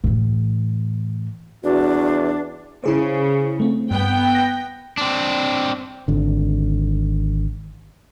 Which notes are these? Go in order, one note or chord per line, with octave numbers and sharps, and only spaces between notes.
A2 E3
E2 D4 F#4
C#3 E4 G#4 C5
A3 C4
G2 B3 G5
A#6
C4 D4
G#1 D3